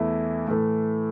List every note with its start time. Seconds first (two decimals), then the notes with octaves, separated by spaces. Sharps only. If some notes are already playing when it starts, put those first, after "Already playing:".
Already playing: E2 E3 A3 E4
0.47 A2 E3 A3